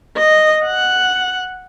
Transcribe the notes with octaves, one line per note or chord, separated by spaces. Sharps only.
D#5
F#5